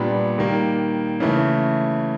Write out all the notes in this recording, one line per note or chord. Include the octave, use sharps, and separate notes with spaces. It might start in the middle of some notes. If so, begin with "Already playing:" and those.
Already playing: A#2 G3 B3 D4
D#3 G3 A#3
C#3 E3 A3